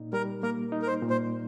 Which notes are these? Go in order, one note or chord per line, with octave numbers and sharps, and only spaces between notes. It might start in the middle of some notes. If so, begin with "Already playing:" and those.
Already playing: A#2 D#4
G3 A#4
A#3 A#4
D#4
A#4
C5
A#2
C5